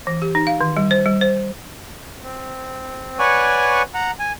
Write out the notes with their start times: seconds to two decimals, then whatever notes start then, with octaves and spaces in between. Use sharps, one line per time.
0.07 E3
0.22 G4
0.35 D#4
0.47 F5
0.61 D#3
0.77 G3
0.91 C5
1.06 G3
1.21 C5
2.23 C4
3.19 B4 C#5 D5 F#5 G#5 C#6
3.94 F#5 A#5
4.19 G#5